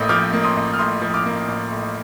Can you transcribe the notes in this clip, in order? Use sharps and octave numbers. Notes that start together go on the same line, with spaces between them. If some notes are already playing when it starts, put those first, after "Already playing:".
Already playing: A1 A2 A#3 D#6 G6
F3 D6 F6
A#3
C6 D#6
A1
F6
A2 C6 D#6
F3
D6 F6
A#3
A1
A2